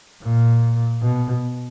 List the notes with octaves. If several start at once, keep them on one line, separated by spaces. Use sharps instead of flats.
A#2
B2